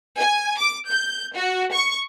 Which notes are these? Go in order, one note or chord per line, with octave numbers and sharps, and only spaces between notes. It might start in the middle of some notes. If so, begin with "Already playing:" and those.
G#5
D6
G6
F#4
C#6